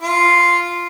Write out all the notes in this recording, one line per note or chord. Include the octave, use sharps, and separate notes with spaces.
F4